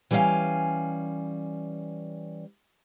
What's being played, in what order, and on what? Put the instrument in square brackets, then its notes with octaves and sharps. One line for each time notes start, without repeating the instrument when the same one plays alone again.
[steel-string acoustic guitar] E3 G3 C#4 D5 F5 G#5